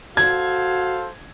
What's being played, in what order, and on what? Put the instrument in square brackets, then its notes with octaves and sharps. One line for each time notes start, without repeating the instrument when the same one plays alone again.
[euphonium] F#4 [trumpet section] A4 C5 F5 [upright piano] G#6